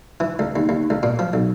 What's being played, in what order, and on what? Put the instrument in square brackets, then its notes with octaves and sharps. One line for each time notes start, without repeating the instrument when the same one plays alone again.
[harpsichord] E3
C#2
D#2
D#2
C#2
A#2
F3
B1